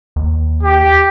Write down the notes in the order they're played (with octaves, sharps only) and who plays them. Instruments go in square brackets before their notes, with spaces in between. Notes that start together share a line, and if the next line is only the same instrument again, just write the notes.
[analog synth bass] D#2
[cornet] G4